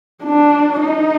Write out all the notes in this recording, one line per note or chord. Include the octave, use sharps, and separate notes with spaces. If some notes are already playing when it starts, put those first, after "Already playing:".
D4
D#4